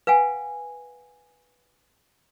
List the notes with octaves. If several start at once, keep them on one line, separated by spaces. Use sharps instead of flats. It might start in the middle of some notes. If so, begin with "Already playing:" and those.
B4 F5 F#5 G#5